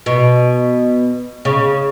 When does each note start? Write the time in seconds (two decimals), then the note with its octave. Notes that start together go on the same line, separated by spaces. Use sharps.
0.06 B2
1.45 C#3